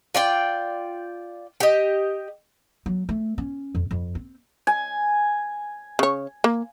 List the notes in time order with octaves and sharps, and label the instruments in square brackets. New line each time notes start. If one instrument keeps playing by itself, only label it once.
[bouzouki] F4 D5 G5
G4 D#5
[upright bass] F#3
A3
C#4
F2
F2
C4
[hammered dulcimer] G#5
[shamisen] C#3 C#5
A#3